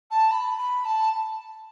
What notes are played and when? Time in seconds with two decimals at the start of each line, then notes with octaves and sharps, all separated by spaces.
0.10 A5
0.30 B5
0.57 B5
0.85 A5